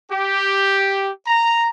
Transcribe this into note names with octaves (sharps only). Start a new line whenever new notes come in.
G4
A#5